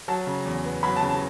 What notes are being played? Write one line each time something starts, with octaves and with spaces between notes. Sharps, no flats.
F#3 A5
C#3
E2
B3
F#3 B5
A5
C#3
A5